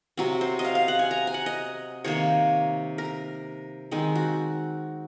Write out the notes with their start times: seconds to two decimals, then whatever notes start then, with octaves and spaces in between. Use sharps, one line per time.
0.17 C3 F#3 C4
0.41 C5
0.59 D#5
0.65 F5
0.75 F5
0.88 F#5
0.99 G#5
1.11 A#5
1.27 G#5
1.34 F#5
1.46 D#5
2.04 C3 D#3 A#3 C#5
2.98 A#4
3.91 D#3 G#3 C4
4.15 F#4